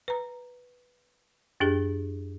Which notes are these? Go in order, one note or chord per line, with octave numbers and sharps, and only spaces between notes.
B4 A#5
F#2 D4 G4 G#4